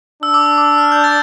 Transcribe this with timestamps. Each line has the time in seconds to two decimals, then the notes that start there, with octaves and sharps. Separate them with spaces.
0.22 D4 E6
0.34 D6
0.46 E6
0.58 D6
0.65 E6
0.78 F6
0.92 G6
1.04 A6